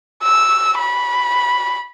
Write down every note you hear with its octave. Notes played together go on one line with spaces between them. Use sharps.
E6
B5